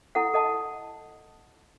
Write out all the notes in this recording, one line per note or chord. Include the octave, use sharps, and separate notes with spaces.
E4 A4 F#5
A4 D#5 A5